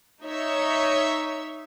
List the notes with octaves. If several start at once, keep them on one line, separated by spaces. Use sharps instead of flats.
D#4 C#5 E5